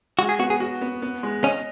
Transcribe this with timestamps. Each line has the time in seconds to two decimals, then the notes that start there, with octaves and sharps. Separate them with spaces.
0.19 G#3 F#4
0.29 G#4
0.39 B3 F#4
0.50 G#4
0.60 F#4
0.81 B3
1.02 B3
1.23 G#3
1.44 C#4 D#5